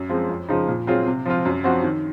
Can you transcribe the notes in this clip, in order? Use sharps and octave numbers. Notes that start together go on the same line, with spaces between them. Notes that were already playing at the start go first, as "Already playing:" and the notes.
Already playing: F#2
F3 G#3 C4
F2
C#3 F3 G#3 D#4
A#2
F#3 C4 F4 G#4
C3
F3 C4 F4
F#2
F3 C4 F#4
D#3